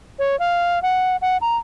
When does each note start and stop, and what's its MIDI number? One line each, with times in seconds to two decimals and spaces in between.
0.19 0.38 73
0.39 0.81 77
0.82 1.16 78
1.22 1.37 78
1.41 1.57 82